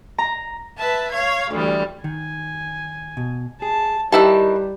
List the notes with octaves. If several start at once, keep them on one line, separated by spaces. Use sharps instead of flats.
A#5
B4 E5 A5
C#5 F5 G#6
D2 E3 G3
D#3 G#5
B2
G#4 A5
D#3 G3 E4 G4 B4 G5 A5